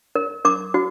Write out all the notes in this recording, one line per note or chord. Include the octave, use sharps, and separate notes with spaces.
A#4
A#4 D6
F#4